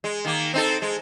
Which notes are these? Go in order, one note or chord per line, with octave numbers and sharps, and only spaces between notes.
G#3
D#3 A#3
C4 D#4 A4
G#3